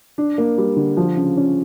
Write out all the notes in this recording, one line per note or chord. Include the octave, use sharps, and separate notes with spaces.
D4
A#3
G3
D3
F3
C#3
C#4